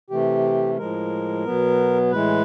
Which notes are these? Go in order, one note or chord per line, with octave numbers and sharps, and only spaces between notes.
C3 E3 A3 G4
A2 F3 G#3 A#4
B2 F#3 B3
A2 E3 G#3 B4